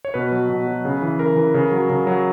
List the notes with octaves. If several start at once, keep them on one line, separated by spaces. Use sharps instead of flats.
C#5
B2 B4
F#3
B2
F#3
C#3
E3
C#3 A#4
E3
C#3
F#3
C#3
F#3